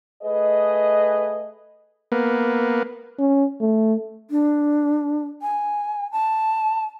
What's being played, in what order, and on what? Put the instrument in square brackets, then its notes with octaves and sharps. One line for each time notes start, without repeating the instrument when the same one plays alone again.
[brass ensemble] A3 G#4 B4 D#5
[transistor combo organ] A#3 B3
[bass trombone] C#4
A3
[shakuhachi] D4
G#5
A5